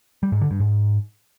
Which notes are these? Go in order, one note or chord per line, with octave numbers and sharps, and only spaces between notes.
G3
G#2
D3
G2
G#2